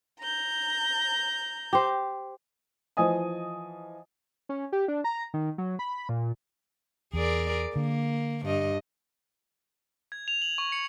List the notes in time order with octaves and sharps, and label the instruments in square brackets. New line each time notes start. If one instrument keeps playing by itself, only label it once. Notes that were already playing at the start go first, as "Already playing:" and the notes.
[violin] A#5 G6
[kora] G4 C5
[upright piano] E3 F3 D#5 G#5 D#6
[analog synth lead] C#4
G4
D4
A#5
D#3
F#3
B5
A#2
[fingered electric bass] E2 [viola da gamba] G#4 A#4 D5
[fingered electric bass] D3 [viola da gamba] A#3
[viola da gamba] G2 D#5
[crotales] G#6
F7
F#7
C#6
C#7